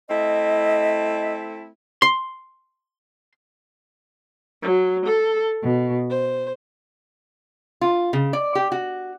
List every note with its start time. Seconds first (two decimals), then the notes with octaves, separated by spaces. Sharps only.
0.09 A3 C4 E4 D#5
2.02 C6
4.62 F#3
5.05 A4
5.62 B2
6.10 C5
7.81 F4
8.13 C#3
8.33 D5
8.55 G4
8.72 F#4